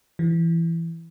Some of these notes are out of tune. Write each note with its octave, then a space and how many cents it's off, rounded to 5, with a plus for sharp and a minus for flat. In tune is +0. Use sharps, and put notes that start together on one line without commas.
E3 +15